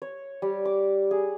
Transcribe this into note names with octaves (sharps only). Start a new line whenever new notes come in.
C#5
G3
D6
G#4